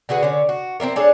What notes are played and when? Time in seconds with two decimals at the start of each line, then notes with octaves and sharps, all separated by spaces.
0.09 D3 F#4 G#4 B4
0.23 D3 C#4
0.49 F#4
0.80 C4 D4 E4 A#4
0.96 D4 G#4 A4 C#5